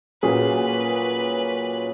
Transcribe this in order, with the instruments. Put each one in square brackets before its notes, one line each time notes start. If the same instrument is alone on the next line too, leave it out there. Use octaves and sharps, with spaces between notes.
[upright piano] A#2 F#3 C#4 G#4 [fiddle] B4